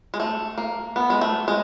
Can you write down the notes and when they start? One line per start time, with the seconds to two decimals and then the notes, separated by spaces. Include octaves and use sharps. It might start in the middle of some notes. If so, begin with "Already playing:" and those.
0.14 G#3
0.20 A3
0.58 A#3
0.96 B3
1.10 G#3
1.21 A3
1.48 G#3